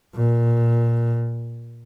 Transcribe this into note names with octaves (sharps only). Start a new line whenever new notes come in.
A#2